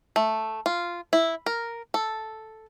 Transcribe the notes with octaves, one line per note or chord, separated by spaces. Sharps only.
A3
F4
E4
A#4
A4